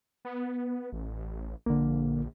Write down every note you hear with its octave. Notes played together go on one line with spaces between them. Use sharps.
B3
A1
A#1 D3 A#3